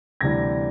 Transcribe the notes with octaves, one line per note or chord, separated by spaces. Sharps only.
D2 C3 E3 G3 G#6 A#6